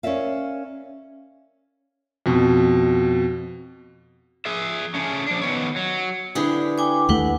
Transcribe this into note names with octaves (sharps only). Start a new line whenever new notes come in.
C#4 A#4 D5 E5 F5
F2 B2
G#4 E5
A3 C#4 G#4
F3 D4
D#3 B3 C#5
F#3
D3 E4 G4 G#4 B4
G5 G#5 D6
D#2 A3 E4 B4 F#5